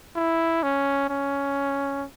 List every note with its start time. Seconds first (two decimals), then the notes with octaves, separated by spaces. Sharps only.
0.16 E4
0.63 C#4
1.09 C#4